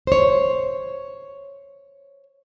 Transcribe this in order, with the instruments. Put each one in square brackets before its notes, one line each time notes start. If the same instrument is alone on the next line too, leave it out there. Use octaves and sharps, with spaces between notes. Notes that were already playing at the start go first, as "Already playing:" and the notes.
[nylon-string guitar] C5 C#5